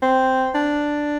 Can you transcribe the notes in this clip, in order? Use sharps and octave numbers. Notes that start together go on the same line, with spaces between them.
C4
D4